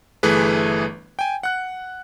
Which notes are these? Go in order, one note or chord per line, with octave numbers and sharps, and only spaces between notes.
G1 E3 A3 G#4 B4
G5 G#5
F#5 F#6